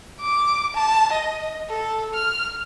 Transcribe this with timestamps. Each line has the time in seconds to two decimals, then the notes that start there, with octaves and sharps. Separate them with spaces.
0.21 D6
0.74 A5
1.13 D#5
1.69 A4
2.14 F6